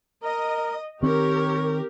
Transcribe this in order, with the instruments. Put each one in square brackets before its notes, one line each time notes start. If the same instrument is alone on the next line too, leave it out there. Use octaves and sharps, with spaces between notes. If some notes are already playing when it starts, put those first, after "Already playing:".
[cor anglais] A#4 [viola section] D#5
[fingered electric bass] D#3 C4 [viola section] G4 A#4 [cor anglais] C#5